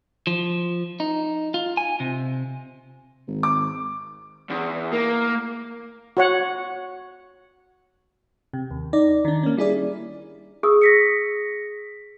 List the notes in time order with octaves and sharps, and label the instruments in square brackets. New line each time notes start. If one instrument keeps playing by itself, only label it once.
[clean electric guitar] F3
D#4
F4
G#5
C3
[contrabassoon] G#1
[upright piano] D6
[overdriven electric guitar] E2
A#3
[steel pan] F#4 C#5 F#5
[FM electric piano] C3
D#2
D#4 D5
D#3 D4
A#3 C#4
G3 E4 G#4 D5
[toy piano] G#4 [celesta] C#6 D#6 E6
[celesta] A#6 B6 C#7